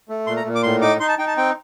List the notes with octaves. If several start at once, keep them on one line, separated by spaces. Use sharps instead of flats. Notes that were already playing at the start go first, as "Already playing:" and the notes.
A3
A#2 C6
A#5
A#2
D6
A2 C6
D#4 D6
D#4 C6
A5
D#4 G5
A5
C4 G5